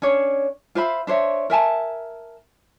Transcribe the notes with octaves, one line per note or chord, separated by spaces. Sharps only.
C#4 D4 C#5
F4 C5 E5 B5
D4 C5 C#5 E5
A#4 E5 G#5 A5